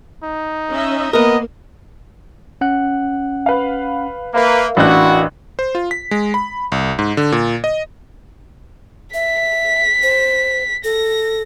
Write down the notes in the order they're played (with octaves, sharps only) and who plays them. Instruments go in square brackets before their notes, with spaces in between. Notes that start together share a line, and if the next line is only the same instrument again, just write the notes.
[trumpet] D#4
[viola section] C#4 D#5 E5
[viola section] A#3 [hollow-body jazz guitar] B3 A#4 [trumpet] D#5
[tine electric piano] C#4 F#5 F#6
[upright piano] B4 F5
[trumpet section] A#3 B4 [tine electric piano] A#4 E5 F5
[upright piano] A1 D4 F#6 [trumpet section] E4 F#4
[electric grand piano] C5
F4
B6
G#3
B5
C2
G#2
D3
A#2
D#5
[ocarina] E5 [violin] B6
[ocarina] C5
[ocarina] A4 [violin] A#6